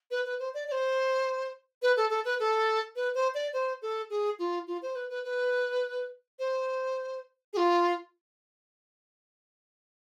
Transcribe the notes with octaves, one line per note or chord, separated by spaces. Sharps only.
B4
B4
C5
D5
D5
C5
B4
A4
A4
B4
A4
B4
C5
D5
C5
A4
G#4
F4
F4
C5
B4
B4
B4
C5
G#4
F4